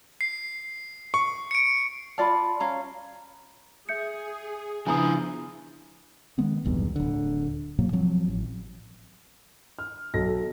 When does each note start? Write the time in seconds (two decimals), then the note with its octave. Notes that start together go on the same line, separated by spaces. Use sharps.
0.21 C7
1.14 C#6
1.51 C#7 D7
2.18 F4 D5 F5 A5 B5
2.60 C#4 F5 A#5
3.89 G#4 E5 G6 C#7
4.87 C#3 F3 B3 D4 E4 G#5 A#5 D#6
6.38 D#3 G#3 B3 C4
6.65 D1 B1 E2 G2
6.96 D1 D3
7.79 G#2 B2 F#3 A#3
7.93 F3 F#3 C4
8.28 A1
9.79 F6
10.14 B1 F#3 A4 A#6